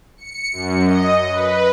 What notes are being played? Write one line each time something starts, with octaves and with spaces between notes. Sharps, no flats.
C#7
F#2
D#5
B4